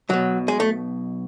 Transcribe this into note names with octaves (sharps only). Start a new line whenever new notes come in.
B1 B2 F#3
G#3
A3